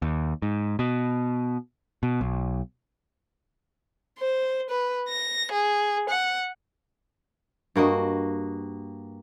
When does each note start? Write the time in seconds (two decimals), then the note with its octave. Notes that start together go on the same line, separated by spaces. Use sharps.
0.02 D#2
0.42 G#2
0.79 B2
2.03 B2
2.21 B1
4.18 C5
4.70 B4
5.09 A#6
5.52 G#4
6.10 F#5
7.76 G2 A#3 F#4 D#5